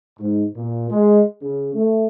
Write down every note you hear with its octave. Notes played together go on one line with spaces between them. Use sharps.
G#2
A#2
G#3
C#3
A3